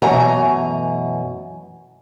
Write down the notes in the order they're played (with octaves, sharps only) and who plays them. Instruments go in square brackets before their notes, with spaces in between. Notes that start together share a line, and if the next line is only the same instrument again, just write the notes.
[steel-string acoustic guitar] F#2 B2 E3 A3 G#5 A#5